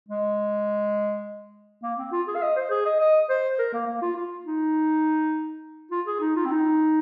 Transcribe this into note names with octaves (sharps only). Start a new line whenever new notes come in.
G#3
A#3
C4
F4
G#4
F5
D#5
C5
G#4
D#5
D#5
C5
A#4
A#3
A#3
F4
F4
D#4
F4
G#4
D#4
F4
C4
D#4